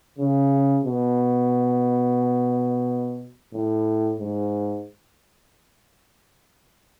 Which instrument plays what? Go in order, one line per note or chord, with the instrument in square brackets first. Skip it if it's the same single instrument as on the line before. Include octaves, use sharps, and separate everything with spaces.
[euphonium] C#3
B2
A2
G#2